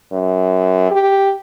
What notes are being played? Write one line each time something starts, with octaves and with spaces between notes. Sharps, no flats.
F#2
G4